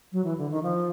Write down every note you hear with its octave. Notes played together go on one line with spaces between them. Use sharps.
F#3
E3
D3
D#3
F3